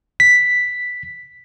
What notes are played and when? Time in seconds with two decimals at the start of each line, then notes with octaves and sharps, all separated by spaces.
0.20 B6